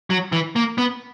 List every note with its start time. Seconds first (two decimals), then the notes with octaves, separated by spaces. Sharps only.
0.10 F#3
0.32 E3
0.56 A#3
0.78 B3